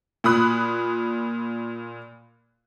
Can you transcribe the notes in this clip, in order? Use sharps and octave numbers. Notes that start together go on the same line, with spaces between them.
A#2 B5 D#6 F#6